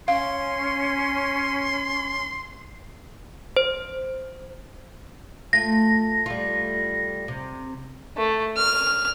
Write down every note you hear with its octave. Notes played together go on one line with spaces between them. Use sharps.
C#4 F5 C6
C5
A3 F4 A#6
G3 A3 F4
C3
A3
F6